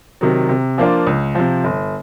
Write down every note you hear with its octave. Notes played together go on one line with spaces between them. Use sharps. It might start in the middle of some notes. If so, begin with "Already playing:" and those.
C3 D#3 F#3
C3
F3 A#3 D4 F4
C#2
C3 F3
G1